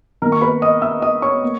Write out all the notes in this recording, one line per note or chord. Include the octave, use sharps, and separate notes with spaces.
D#3 A#3 A#4 A#5
C#6
B4 B5
D#5 D#6
E5 E6
D#5 D#6
C#5 C#6
A#3